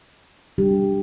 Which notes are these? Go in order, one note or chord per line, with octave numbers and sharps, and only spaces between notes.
C3 G3 D4 G4